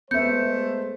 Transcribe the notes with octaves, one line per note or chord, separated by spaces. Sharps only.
G#3 A3 B3 C5 E5 G6 C#7